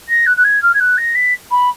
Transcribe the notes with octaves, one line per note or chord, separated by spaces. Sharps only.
A#6
F#6
F#6
G#6
F6
G#6
F#6
A#6
B6
B5